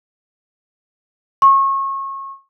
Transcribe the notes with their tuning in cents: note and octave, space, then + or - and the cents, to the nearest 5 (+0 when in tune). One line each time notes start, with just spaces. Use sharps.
C#6 -30